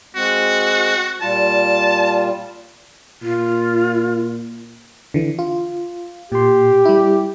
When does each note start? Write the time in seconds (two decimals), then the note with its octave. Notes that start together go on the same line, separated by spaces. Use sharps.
0.15 G#3 C4 F#4
1.21 A#2 G3 F4 A5
3.22 A#2 F4
5.14 D3 E3
5.39 F4
6.32 A#2 G4 C6
6.85 G3 E4